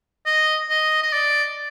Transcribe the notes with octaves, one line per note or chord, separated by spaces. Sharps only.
D#5
D#5
D#5
D5